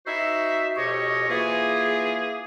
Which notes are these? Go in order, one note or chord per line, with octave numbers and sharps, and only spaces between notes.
D#4 F#4 C5 E5
F2 B2 G4 C#5 D#5 C#6
E3 A#3 F4 G#4